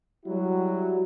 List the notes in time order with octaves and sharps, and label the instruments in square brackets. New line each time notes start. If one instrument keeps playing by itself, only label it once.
[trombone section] F#3 G3 E4 F#4